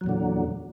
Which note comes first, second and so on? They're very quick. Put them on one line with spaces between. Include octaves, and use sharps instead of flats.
F#3 E2 A#2 D3